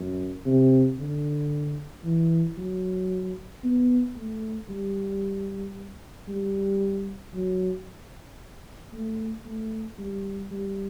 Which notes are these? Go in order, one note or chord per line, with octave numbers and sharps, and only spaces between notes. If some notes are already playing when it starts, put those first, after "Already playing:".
Already playing: F#2
C3
D3
E3
F#3
B3
A3
G3
G3
F#3
A3
A3
G3
G3